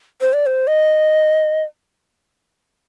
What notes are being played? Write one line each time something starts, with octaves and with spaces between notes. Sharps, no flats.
C5
D5
C5
D#5